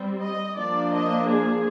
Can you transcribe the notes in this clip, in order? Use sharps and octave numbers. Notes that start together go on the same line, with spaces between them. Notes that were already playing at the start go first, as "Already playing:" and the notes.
Already playing: G3 C4
D#5
F3 A#3 D4 D5
D#5
G#4